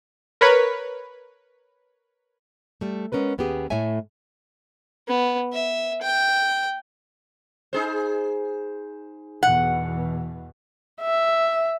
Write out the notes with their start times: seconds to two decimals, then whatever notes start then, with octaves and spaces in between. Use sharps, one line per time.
0.41 A#4 B4 C#5 B5
2.81 G3 A3
3.12 G#3 B3 C#4 A#4 B4
3.38 D#2 B3 C#4 G4 G#4 B4
3.70 A2 A3 C#5 E5 G#5
5.08 B3
5.53 E5
6.02 G5
7.73 D#4 G#4 C5
9.43 E2 B2 E3 F#5
11.01 E5